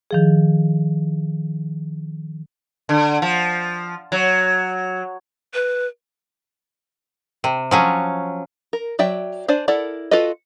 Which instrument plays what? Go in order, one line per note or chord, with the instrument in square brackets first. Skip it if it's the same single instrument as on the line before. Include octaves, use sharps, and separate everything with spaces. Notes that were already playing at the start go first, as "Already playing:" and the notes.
[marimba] D#3 F3 G#4
[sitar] D3
F3
F#3
[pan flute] B4
[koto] C3
F3 F#3 C#4
[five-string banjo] A#4
F#3 D5 E5 G5
D4 C5 D5 G#5
E4 A4 A#4 D5 F#5
F4 F#4 A4 B4 D#5